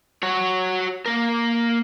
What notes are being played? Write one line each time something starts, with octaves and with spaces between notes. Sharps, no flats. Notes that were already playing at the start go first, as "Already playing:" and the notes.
F#4 C#5
A#3 A#4